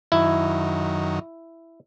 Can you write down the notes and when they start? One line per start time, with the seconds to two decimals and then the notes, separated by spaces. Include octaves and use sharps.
0.12 F#2 D#3 E4